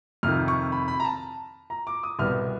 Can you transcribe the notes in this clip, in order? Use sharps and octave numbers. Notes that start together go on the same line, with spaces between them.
F2 C3 D#3 F6
C#6
B5
B5
A#5
A5
A#5
D6
D#6
C2 B2 G3 B3 F6